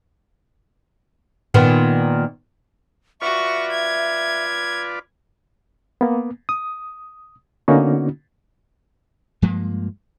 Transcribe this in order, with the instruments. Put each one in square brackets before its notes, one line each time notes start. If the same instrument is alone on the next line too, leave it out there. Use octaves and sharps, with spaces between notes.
[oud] A#2 D#3 B3
[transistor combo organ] F4 B4 D5 [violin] F#4 C#6 [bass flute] E5
[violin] G#6
[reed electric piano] A#3 B3
D#6
D3 A#3 B3 C#4 D#4 F#4
[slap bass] G2 F3 G#3 A#3